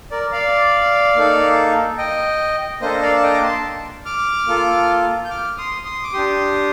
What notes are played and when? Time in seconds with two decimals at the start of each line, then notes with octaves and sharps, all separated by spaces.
0.11 A#4 D5
0.32 D5 F5
1.16 A#3 D#4 A4
1.98 D#5 G5
2.81 A#3 D4 A4 C5 D#5
3.02 D5 F5
3.16 A5
3.23 D#5 G5
3.34 D6
3.43 A5 C6
4.05 D6 F6
4.47 A#3 F4 A4
5.25 G6
5.30 D6 F6
5.58 C6 D#6
5.85 C6 D#6
6.03 D6
6.13 D4 G4 C6 D#6